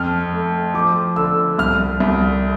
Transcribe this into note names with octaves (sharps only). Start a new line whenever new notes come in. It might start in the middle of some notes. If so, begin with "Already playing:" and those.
Already playing: F2 F6
A3
F3 D6
D3 E6
C2 F6
C2